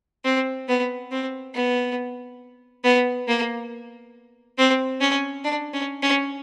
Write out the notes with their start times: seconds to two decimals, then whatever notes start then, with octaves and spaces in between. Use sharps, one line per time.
0.25 C4
0.68 B3
1.11 C4
1.54 B3
2.84 B3
3.28 A#3
4.58 C4
5.01 C#4
5.44 D4
5.73 C#4
6.03 C#4